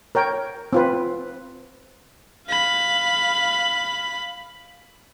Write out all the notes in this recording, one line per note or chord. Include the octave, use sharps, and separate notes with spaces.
A#4 C#5 G5
C4 F4 B4
F5 B5